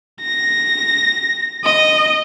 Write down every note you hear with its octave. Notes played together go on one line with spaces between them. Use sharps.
A#6
D#5